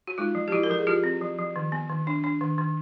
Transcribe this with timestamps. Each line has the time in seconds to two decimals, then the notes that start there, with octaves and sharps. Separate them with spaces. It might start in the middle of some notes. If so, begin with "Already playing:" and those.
0.07 F#4
0.18 G#3 D#4 F4
0.35 F3
0.48 G4
0.52 F3 E4 F#4
0.63 A#4
0.70 F3 A4
0.78 G#4
0.87 F3 F4 G4
1.04 C4
1.21 F3
1.38 F3
1.56 D#3
1.72 B3
1.89 D#3
2.07 D4
2.24 D4
2.41 D#3
2.58 D#3